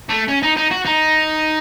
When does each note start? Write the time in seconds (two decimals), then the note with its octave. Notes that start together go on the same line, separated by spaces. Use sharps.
0.09 A3
0.28 C#4
0.43 D#4
0.57 D#4
0.71 F#4
0.85 D#4